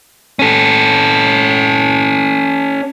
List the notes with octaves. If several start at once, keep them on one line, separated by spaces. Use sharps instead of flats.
C#4 A4